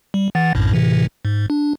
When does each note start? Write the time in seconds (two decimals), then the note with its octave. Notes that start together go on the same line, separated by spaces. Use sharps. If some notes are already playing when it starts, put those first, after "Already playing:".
0.14 G3
0.35 E3 F#5 A6
0.55 A#1 F#2 A2
0.74 A2 C3 E3
1.25 G#2
1.50 D4